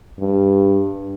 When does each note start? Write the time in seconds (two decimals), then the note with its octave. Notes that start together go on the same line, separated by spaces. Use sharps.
0.20 G2